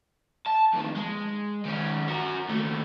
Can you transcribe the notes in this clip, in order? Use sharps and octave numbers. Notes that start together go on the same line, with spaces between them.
A5
F2 D#3
G#3
D#3 C#4
F#4 A#4
D#2 A3